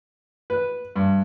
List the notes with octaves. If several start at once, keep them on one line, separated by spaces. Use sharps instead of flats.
B4
G2